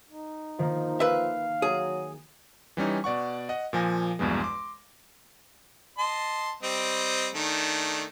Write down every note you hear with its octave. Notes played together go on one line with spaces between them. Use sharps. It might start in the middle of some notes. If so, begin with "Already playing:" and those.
D#4
D#3 F3 A#3
B4 E5 F5
F#3 G#4
E3 G3 C#4 D#4
B2 D5 F#5 C#6
D#5 F#5
A#2 F3 G#5 A#6
A#1 E2 G2 B2 G#3
C6 D6
D#5 A5 C6
G3 C4 D#5
D#3 A3 D4